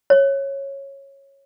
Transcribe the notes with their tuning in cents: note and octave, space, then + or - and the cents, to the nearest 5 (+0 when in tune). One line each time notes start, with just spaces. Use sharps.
C#5 -10